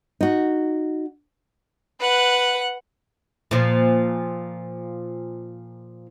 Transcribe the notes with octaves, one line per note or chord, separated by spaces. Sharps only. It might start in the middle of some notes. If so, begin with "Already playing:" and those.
D#4 F#4
B4 F#5
A#2 F3